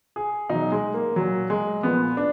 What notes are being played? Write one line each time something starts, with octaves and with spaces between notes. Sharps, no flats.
G#4
B2 F#3 D#4
G#3
A#3
A#2 F#3
G#3
A#2 F3 B3
D4